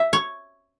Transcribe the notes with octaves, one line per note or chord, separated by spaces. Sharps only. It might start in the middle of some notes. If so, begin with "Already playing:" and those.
Already playing: E5
C#5